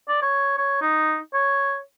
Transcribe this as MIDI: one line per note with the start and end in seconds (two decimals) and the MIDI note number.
0.09 0.22 74
0.22 0.58 73
0.58 0.79 73
0.82 1.18 63
1.34 1.79 73